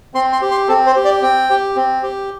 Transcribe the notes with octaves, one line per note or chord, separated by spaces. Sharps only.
C4 C6
C6
G4
C6
C4 A4
C5
G4
D5
C4 G5
G4
C4
G4